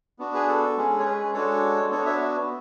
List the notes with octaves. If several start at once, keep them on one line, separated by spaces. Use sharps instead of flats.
B3 D4 F#4
G#4 B4
A4
G#3 C#4 G#4
C#5
G#4 B4
G#3 D4 F#4 A4 C#5
B3 D4 F#4 A4 C#5
C#5 E5